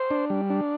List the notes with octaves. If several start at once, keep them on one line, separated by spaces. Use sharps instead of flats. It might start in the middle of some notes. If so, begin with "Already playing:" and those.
Already playing: C5
D4
G3
D4